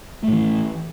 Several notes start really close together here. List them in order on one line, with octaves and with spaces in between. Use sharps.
A3 A2 E3